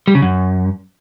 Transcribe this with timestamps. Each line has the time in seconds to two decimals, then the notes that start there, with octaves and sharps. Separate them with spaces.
0.08 G3
0.15 C#3
0.22 F#2